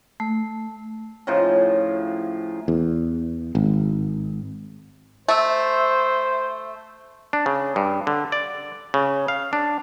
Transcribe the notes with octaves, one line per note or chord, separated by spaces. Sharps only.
A3
A2 C#3 F3 D#4
E2
G#1
A3 C5 E5
D4
C#3
G2
D3
D5
C#3
F5
D4